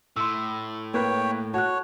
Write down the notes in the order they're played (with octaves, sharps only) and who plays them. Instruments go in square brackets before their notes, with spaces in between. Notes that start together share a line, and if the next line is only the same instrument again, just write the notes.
[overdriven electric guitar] A2 [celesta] C6 E6
[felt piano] A#3 B4 [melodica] C#5 G5
[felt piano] F#4 [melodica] C#5 [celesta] A5 F#6